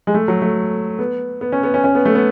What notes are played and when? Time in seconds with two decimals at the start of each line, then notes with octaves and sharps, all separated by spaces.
0.07 G#3
0.14 A3
0.28 F#3
0.42 A3
0.99 B3
1.41 B3
1.52 C#4
1.63 B3
1.74 C#4
1.84 C#4
1.95 B3
2.05 A3
2.15 B3